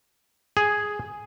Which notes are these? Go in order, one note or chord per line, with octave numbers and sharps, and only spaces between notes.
G#4